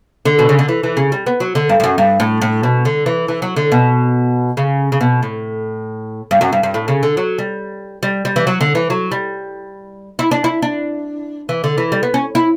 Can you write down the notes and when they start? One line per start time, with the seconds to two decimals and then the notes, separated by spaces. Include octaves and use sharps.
0.25 D3
0.39 B2
0.49 C#3
0.59 D3
0.69 E3
0.83 E3
0.97 C#3
1.12 G3
1.26 B3
1.40 F#3
1.55 D3
1.69 G2
1.80 G2
1.84 F#2
1.98 G2
2.20 A2
2.42 A2
2.63 B2
2.85 D3
3.06 E3
3.28 E3
3.42 F#3
3.56 D3
3.72 B2
4.57 C#3
4.92 C#3
5.01 B2
5.23 A2
6.31 G2
6.41 F#2
6.52 G2
6.63 G2
6.74 A2
6.88 C#3
7.03 D3
7.17 F#3
7.38 G3
8.03 G3
8.25 G3
8.36 E3
8.47 F#3
8.61 D3
8.75 E3
8.90 F#3
9.11 G3
10.19 E4
10.31 D4
10.44 E4
10.62 D4
11.49 E3
11.64 D3
11.78 E3
11.92 G3
12.03 B3
12.14 C#4
12.35 E4